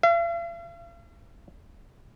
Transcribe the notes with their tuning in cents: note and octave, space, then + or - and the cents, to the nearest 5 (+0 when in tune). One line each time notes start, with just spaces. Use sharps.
F5 -45